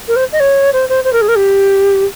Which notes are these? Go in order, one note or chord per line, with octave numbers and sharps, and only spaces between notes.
A#4
C5
D#5
C#5
C5
C5
C5
A#4
G#4
A#4
G4